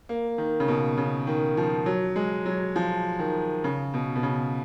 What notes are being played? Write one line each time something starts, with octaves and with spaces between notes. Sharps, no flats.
A#3
D#3
C#3
B2
C#3
D#3
F3
F#3
G#3
F#3
F3
D#3
C#3
B2
B2
C#3